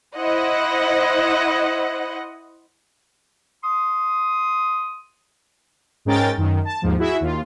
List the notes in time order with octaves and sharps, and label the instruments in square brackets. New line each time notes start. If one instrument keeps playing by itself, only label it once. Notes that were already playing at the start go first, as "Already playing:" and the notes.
[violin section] E4 C5 D#5 F#5
[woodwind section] C6 D#6
[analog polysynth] G#2 G#3 C#4 A#4 G5 A6
F#2 D#3
A5
D#2 G#2 F3
E4 F#4 G#4 E5
D#2 F4